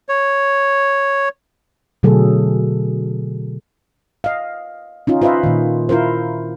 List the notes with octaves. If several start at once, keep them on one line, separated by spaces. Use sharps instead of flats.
C#5
B2 D3 F#3 A3 G#4 A4
D#5 F5
C#4 D#4 F4
F4 B4 C5 D#5 E5
A#2 D#3
E4 F4 A#4 C5